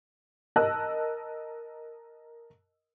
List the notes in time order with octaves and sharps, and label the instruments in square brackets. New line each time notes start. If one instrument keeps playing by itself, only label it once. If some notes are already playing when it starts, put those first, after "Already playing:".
[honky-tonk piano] A#4 D#5 A5 E6 F#6